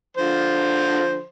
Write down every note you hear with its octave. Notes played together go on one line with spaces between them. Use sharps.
D3 F3 C5